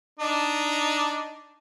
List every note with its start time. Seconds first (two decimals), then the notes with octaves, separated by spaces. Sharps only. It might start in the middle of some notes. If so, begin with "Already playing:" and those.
0.20 D4 D#4